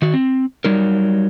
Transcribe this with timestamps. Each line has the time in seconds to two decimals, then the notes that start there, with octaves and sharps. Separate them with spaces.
0.02 D#3 F#4
0.14 C4
0.64 F#3 G3 D#4 A#4